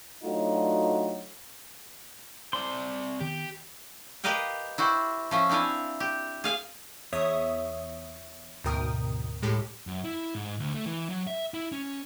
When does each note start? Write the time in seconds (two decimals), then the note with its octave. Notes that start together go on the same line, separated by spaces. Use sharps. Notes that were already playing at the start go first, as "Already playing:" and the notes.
0.24 F#3 A3 D4 D#4 F4 F#4
2.53 C4 D5 C6
3.20 D#3 B3 G4
4.24 G4 A#4 B4 D#5 F5 G5
4.78 E4 F#4 G4 C5
5.31 F3 C#4 E5
5.49 C4 D4 E4 F5 G#5
6.00 G4
6.44 G#4 F5 G#5
7.13 E2 C#5 E5 D#6
8.64 D2 G#2 B2 A#4 G5 D#6
9.43 A2 G#3 G4 A4
9.87 F#2
10.05 E4
10.35 G#2
10.60 D2
10.74 A3
10.86 E3
11.10 F#3
11.27 E5
11.54 E4
11.72 C#4